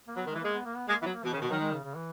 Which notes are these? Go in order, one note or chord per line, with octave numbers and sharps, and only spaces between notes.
A#3
F#3 B3
D#3
G#3
E3
G#3 A#3
B3
A#3
B3
G#3 A#3
E3 B3
F#3
A#3
B2 E3
C#3
D#3
B2
D#3 F#3
G#3
C#3
C#3
E3